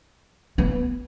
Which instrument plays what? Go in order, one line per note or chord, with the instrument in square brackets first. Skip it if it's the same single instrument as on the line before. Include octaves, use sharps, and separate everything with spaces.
[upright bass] B3